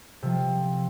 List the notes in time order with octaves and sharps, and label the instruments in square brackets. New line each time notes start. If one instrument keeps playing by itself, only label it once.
[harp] C3 F3